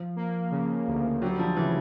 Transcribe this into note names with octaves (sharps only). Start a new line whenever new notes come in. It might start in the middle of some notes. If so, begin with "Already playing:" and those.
Already playing: F3
A#3
C#3
D2
F#3 G3
F3
C#3 E3